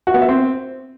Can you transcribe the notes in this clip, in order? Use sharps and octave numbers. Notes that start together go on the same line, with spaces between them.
F#4
B3
E5
C4